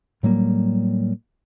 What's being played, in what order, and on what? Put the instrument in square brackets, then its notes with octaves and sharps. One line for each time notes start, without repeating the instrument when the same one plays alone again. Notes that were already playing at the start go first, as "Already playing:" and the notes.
[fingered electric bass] A2 F#3 G3 A#3